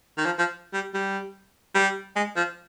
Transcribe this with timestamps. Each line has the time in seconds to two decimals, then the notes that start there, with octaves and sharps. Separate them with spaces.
0.18 D#3
0.25 F3
0.39 F3
0.73 G3
0.94 G3
1.75 G3
2.16 G#3
2.36 F3